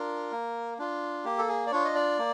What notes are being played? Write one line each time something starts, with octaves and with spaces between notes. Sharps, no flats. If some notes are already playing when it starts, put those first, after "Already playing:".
Already playing: D4 F4 A#4
A#3
D4 F4
A#3 G4
A4
G#4
D5
D4 F4 C#5
D#5
D5
A#3